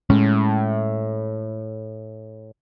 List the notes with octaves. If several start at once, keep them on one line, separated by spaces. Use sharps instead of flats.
A2 G#3 C#4